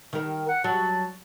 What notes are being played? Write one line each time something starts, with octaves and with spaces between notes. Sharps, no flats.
D#3 A#4
F#5
F#3 A5